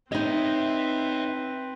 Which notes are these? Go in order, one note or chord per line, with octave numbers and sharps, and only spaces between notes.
C4 D#4 B4 C#5 D#5 E5